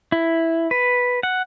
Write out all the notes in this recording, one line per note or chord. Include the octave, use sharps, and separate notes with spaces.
E4
B4
F#5